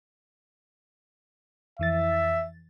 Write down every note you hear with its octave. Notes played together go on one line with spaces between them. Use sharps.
F2 E3 E5 A6